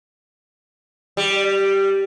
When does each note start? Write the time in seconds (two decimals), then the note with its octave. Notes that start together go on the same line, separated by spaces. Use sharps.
1.17 G3